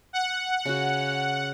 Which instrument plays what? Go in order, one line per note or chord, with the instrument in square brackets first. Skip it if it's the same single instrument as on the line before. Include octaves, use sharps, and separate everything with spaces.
[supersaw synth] F#5
[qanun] C#3 F#4